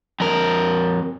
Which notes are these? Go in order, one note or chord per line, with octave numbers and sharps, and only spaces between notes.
F2 A#4